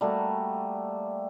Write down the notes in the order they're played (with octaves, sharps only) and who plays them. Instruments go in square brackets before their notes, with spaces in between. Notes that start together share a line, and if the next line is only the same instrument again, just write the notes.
[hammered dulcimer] G3 A3 A#3 F#4